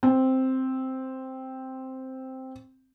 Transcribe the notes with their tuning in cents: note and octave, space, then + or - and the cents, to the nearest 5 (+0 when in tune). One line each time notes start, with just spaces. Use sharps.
C4 +0